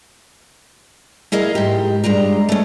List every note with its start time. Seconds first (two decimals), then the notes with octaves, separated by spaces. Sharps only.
1.32 E4 G#4 A#4 D#5 F5
1.55 G#2 G4
2.04 G2 G#3 G4 A#5
2.49 A3 B3 C#4